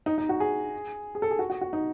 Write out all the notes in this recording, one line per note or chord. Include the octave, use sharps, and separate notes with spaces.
D#4
D#4
F#4
G#4
G#4
A4
G#4
F#4
F#4
F#4
D#4